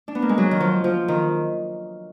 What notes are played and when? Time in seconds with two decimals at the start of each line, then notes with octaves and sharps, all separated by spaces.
0.08 D4
0.15 B3
0.22 A#3
0.29 G#3
0.38 F#3
0.51 D#3
0.60 F3
0.84 F3
1.08 D#3